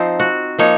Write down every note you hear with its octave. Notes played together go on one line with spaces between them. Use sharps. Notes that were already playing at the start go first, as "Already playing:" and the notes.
Already playing: F3 C4 D#4
F#4
F3 A#3 D#4 C#5